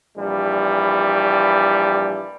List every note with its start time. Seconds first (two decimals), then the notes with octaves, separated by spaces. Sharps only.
0.18 A#1 E3 G3